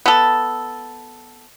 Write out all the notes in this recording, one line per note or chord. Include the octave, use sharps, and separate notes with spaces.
B3 A4